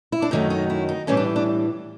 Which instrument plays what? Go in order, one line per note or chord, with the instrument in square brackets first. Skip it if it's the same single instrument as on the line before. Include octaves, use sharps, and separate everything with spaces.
[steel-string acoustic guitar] E4
D4
F#2 D#3 F#3 A3 D#4
D#4
E4
D#4
A2 E3 G3 C#4
D4
D4